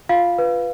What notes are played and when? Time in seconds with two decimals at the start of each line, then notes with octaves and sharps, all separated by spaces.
0.09 F4 F5
0.38 B4